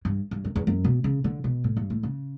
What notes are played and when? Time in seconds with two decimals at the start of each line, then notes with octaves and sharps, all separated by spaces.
0.05 G2
0.31 G2
0.45 F#2
0.56 E2
0.67 F#2
0.84 B2
1.04 C#3
1.24 D3
1.44 B2
1.64 A2
1.77 G2
1.90 A2
2.03 C#3